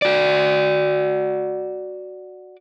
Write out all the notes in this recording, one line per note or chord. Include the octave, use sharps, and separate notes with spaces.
F#4 D5